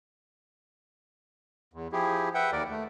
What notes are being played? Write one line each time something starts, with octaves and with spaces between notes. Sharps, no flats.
E2
F3 E4 G4 G#4
B4 E5 F#5 G5
D#2 A#4 D5
A3